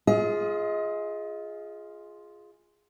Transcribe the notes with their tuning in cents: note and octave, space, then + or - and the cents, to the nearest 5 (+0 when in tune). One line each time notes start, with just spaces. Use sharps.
F4 +0 G#4 +0 D#5 +30